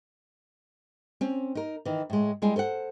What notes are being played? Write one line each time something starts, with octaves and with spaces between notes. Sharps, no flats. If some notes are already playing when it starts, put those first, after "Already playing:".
C4 C#4
D#4 A#4
D#3 E3
A2 G#3
G3 G#3 E4 G4 G#4
A4 C5 D#5 F#5